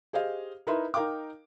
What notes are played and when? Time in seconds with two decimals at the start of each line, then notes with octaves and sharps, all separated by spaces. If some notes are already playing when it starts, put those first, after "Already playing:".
0.13 G4 G#4 C5 D#5 F5
0.67 D#4 E4 A#4 B4 E5 C6
0.94 D#4 A#4 F5 G5 D6